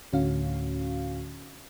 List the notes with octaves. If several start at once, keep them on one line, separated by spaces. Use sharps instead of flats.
D2 A2 D3 C#4 F#4 F5